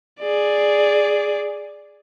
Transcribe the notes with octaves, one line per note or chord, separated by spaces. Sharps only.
G#4 D5